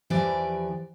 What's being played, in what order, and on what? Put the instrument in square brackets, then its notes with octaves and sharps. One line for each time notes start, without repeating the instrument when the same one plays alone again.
[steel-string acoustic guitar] E2 E3 F3 G4 D5